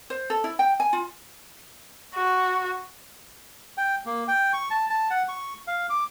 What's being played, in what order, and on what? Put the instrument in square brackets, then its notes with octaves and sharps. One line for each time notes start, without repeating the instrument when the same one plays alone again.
[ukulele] C5
A4
E4
G5
G#5
F4
[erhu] F#4
[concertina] G5
A#3
G5
C#6
A5
A5
F#5
C#6
F5
D6